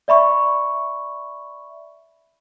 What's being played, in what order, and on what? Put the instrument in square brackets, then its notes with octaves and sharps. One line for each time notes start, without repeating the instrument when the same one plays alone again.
[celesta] D5 E5 B5 C#6